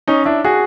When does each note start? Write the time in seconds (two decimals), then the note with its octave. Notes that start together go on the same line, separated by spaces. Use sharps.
0.08 C#4 D#4
0.25 D4 E4
0.44 F#4 G#4